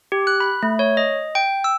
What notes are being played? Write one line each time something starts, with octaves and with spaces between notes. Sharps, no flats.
G4
F#6
B5
A3
C#5
D#5
G5
E6